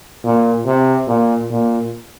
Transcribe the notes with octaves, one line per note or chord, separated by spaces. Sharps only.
A#2
C3
A#2
A#2